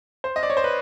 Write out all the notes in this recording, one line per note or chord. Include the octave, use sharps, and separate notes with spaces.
C5
D#5
D5
C#5
C5
B4